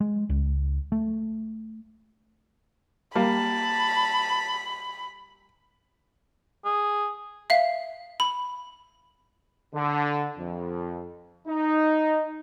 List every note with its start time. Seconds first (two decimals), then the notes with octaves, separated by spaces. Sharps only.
0.01 G#3
0.30 C#2
0.92 A3
3.16 G3 A#3 A5 B5
6.65 G#4
7.50 E5 F5
8.20 B5
9.74 D3
10.38 F2
11.48 D#4